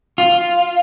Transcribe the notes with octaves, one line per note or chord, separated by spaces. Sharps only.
F4